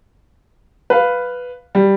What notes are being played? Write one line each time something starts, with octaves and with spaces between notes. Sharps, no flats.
B4 F5
G3